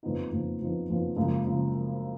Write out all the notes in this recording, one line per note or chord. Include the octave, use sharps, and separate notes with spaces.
F#1 F2 F3 B3 D#4
F#1 F2 F3 B3 D#4
F#1 F2 F3 B3 D#4
F#1 F2 F3 B3 D#4
F#1 F#2 C#3 F3 G#3
C#3 F3